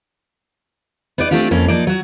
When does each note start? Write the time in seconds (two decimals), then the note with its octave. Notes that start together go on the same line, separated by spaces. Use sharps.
1.18 B3 D#4 B4 D5
1.31 A3 C4 D4 F4 G4
1.51 F2 A#3 C#4 A4
1.68 F3 A#3 D#4 D5
1.87 F#3 F#4